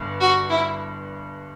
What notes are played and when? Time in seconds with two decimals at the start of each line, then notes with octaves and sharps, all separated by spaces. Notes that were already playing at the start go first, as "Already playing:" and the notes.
Already playing: G1 G2
0.21 F#4
0.50 E4